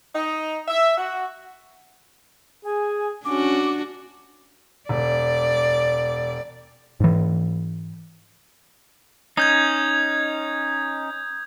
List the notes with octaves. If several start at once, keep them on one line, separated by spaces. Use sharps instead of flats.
D#4
E5
F#4
G#4 G#5
C#4 D4 F#4 D6
E1 D5
G#2 E3
C#4 D#4 D#6 G6 G#6